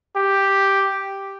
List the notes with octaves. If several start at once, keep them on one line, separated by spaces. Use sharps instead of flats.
G4